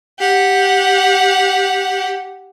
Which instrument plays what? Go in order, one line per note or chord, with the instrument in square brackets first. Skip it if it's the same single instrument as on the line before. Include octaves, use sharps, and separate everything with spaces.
[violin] G4 F#5